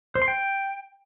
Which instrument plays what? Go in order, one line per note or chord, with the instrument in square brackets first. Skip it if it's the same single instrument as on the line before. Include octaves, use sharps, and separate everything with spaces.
[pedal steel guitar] C5
C6
G5